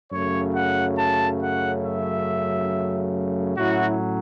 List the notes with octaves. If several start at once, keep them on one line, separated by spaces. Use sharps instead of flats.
F#2 C#3 F#3 A3 C#5
F#5
A5
F#5
E5
A2 F#3 C#4 E4 F#4